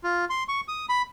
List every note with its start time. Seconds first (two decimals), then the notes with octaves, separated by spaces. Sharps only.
0.04 F4
0.30 C6
0.48 C#6
0.68 D#6
0.89 B5